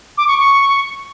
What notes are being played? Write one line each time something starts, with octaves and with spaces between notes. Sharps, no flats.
D6
C#6
C#6